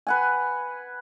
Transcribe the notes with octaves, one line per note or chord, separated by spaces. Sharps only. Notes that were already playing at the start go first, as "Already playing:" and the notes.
B4 F#5 G#5